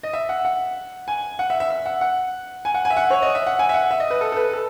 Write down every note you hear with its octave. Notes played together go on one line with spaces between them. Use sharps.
D#5
E5
F#5
F#5
G#5
F#5
E5
E5
E5
F#5
F#5
G#5
F#5
G#5
E5
F#5
C#5
D#5
E5
F#5
G#5
E5
F#5
E5
D#5
B4
A4
A4
B4
A4